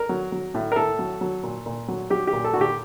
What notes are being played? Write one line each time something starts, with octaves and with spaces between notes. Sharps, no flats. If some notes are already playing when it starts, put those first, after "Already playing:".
Already playing: A#4
F#3
F#3
A2
A#4
A2 A4
F#3
F#3
A#2
A#2
F#3
F#3 G4
G4
A#2
A4
A#2 F#4
G4